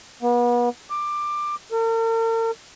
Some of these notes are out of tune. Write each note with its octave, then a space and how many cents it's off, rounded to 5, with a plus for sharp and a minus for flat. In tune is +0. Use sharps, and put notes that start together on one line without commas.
B3 -35
D6 +15
A#4 -45